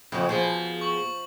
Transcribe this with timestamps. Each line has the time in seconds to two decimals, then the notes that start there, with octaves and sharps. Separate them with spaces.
0.12 F2 C#3 F#4
0.29 B2 F3 G#4 C5
0.81 C#6 F#7